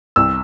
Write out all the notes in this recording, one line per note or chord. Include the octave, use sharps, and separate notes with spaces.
C2 E6